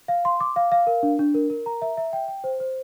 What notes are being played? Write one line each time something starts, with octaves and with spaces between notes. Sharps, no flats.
F5
C6
D6
F5
F5
A#4
D4
D4
A#4
A#4
A#5
E5
E5
G5
G5
C5
C5